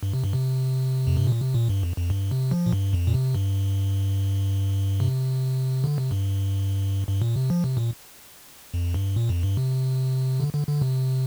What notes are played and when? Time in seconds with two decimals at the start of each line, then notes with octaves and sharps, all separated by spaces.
0.03 G2
0.14 C3
0.24 G2
0.33 C3
1.07 F2
1.17 G2
1.27 A#2
1.41 C3
1.54 A#2
1.69 G2
1.83 F2
1.97 F2
2.10 G2
2.31 C3
2.51 F3
2.66 A#2
2.73 G2
2.93 F2
3.07 A#2
3.14 C3
3.35 G2
5.00 C3
5.84 D3
5.98 C3
6.11 G2
7.08 G2
7.22 A#2
7.36 C3
7.50 F3
7.64 C3
7.77 A#2
8.74 F2
8.94 G2
9.16 A#2
9.29 F2
9.43 G2
9.57 C3
10.40 D3
10.54 D3
10.68 D3
10.81 C3